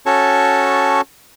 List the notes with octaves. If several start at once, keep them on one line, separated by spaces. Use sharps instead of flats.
C#4 F#4 A4 C#5 A5 C#6